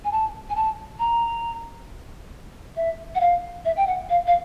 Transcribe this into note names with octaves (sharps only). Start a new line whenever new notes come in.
G#5
A5
G#5
A5
A#5
E5
F#5
F5
E5
G5
F#5
F5
F5